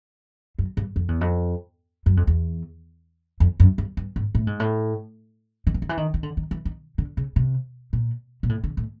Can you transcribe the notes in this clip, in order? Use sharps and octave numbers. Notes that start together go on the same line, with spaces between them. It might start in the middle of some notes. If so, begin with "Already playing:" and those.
F#2
G2
F2
E2
F2
F#2
F2
E2
F2
F#2
G2
G2
G#2
A2
G#2
A2
D#3
E3
D#3
E3
D#3
D#3
D3
D#3
E3
D#3
D3
C#3
C3
A#2
A#2
A2
D3
A2